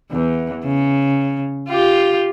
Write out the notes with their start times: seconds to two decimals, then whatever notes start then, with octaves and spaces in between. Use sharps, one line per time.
0.11 E2
0.65 C#3
1.69 F4 G4